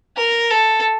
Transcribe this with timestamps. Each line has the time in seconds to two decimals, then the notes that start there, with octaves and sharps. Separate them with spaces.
0.17 A#4
0.51 A4